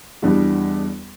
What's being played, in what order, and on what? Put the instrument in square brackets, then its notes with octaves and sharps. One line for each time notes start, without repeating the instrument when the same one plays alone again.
[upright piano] E2 B2 G3 B3 D4